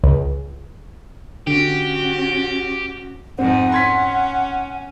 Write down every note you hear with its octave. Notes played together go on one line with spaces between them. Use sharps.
C#2
D3 C#4 F#4 G4
F2 G#2 C4 D#4 F#5
C#4 C6 G#6 B6